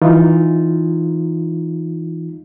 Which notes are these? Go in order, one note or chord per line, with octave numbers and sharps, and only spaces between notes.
E3 D#4 F4